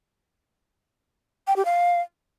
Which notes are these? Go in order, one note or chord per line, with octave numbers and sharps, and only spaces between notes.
G5
G4
F5